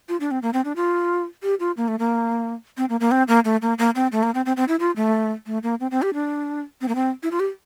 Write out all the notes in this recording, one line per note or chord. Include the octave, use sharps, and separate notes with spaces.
F4
D4
C4
A#3
C4
D4
F4
G4
F4
A#3
A3
A#3
C4
A#3
A#3
C4
A#3
A3
A#3
A#3
C4
A3
A#3
C4
C4
C4
E4
F4
A3
A3
A#3
C4
C4
G4
D4
C4
A#3
C4
E4
F4
G4